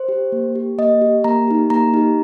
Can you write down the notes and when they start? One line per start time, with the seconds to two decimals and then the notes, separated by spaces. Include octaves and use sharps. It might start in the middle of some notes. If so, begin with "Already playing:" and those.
Already playing: C5
0.08 G4
0.32 A#3
0.55 G4
0.78 A#3 D#5
1.01 G4
1.24 A#3 A#5
1.48 D#4 G4
1.70 A#3 A#5
1.94 D#4 G4